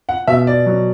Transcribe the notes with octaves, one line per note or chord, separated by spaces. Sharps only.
F#5
B2 E5
D5
F#3